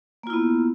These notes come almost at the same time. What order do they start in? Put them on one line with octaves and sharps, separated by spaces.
A#3 F4 E4 B3